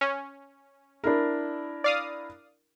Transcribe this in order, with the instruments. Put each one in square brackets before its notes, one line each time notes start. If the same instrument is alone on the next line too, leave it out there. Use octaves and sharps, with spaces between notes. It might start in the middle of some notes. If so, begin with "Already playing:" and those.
[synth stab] C#4
[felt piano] D4 E4 A#4
[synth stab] D5 F5 D#6